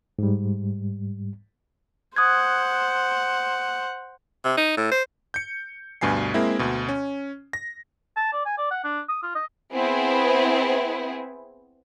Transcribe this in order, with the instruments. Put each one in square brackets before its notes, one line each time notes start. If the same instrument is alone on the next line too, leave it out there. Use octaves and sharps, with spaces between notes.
[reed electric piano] G#2 G3
[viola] C5 F#5 [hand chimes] D#6 F#6 G#6
[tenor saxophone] C3
D#4
A2
C5
[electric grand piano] G6 C#7
D2 G2 B2 G#5 C7
G#3 A#3 C4 E4
D2 B2
C#4
A#6
[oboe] A5
D5
G#5
D5
F#5
D4
D#6
F4
D#5
[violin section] B3 C4 E4 G#4